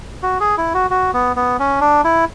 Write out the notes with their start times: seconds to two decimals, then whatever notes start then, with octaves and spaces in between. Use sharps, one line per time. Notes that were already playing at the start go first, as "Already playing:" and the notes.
0.23 F#4
0.40 G#4
0.58 E4
0.74 F#4
0.90 F#4
1.14 B3
1.36 B3
1.59 C#4
1.81 D4
2.04 E4